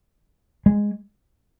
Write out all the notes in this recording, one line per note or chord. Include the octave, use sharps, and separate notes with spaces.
G#3